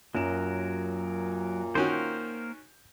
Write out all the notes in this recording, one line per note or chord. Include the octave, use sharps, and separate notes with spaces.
F#2 A#2 F#3 A#4 E7
D#3 A#3 C#4 F#4 A#4 C5 G6